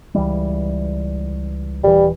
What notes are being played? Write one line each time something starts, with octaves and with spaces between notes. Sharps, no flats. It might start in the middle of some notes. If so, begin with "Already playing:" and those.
C#2 E3 G3
D#1 E3 G3